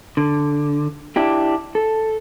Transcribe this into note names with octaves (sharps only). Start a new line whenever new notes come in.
D3
D4 E4 G4
A4